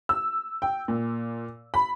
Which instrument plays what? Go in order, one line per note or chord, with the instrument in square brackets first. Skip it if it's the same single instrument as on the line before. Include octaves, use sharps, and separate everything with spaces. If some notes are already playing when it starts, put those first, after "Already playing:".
[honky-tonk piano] E6
G5
A#2
B5